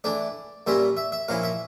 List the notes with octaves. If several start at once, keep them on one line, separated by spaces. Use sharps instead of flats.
E3 A3 D4 D5
A#2 G3 C#4 F4 E5
E5
E5
A#2 F3 C#4 E4 F5
E5